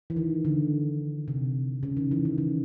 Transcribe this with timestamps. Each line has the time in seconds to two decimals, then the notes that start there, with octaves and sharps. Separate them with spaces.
0.10 E3
0.16 D#3
0.45 D3
1.28 C3
1.83 C#3
1.97 D#3
2.11 E3
2.25 D#3
2.38 C#3